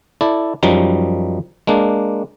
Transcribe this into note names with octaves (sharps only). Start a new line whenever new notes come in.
E4 A4 D5
F#2 F3 G3 D#4
G#3 A#3 D4